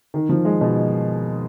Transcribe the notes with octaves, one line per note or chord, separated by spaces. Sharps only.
D#3
F3
G#3
B2